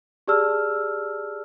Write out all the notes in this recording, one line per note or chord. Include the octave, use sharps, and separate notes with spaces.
G4 G#4 D5 A5 E6 F6